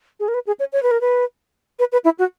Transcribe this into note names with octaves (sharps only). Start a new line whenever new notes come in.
G#4
A#4
B4
G#4
C#5
C#5
B4
A#4
B4
B4
B4
E4
F#4